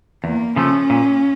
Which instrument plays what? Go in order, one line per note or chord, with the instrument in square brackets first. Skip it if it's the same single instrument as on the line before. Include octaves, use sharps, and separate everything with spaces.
[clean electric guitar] E2 [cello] A#3
[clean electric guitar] C#3 F3 A3 [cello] C#4
[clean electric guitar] A#2